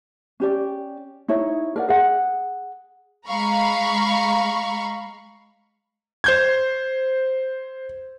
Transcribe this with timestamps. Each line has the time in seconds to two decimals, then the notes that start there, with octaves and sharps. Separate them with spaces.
0.40 C#4 G4 D5
1.28 D#4 E4 C#5
1.76 A#4 D5 F#5
1.89 G#4 F#5
3.28 G#3 F5 A#5 B5 C#6
6.24 C5 G6 G#6